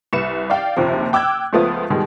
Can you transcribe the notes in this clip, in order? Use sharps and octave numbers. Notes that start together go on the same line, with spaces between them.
C2 B4 C#7 E7
D5 F5 G5
F#1 D#2 C3 F3
G5 D6 E6 F#6 G#6
C#2 F3 A3 B3 F4 D#6
B2 D#3 G3 G#3